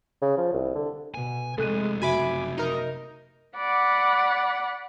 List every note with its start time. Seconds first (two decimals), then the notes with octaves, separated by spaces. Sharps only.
0.22 C#3
0.38 F3
0.53 C2
0.75 D3
1.14 B2 G#5
1.58 C3 G#3 A3 A4 F#6 D#7
2.02 F#1 F#4 E5 G#5 B5 D6
2.58 D#4 A#4
3.56 D5 F#5 B5